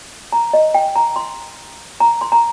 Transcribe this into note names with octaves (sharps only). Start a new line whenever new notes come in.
A#5
D#5
G5
A#5
C6
A#5
C6
A#5